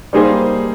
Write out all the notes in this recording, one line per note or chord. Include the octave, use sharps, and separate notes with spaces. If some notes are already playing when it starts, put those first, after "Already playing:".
G3 A#3 D#4 G#4 C5